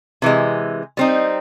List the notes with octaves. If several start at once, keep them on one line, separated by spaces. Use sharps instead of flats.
C3 E3 G#3
G3 C4 D#4